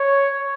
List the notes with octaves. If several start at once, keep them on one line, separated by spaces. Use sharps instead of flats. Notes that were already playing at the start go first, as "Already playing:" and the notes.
Already playing: C#5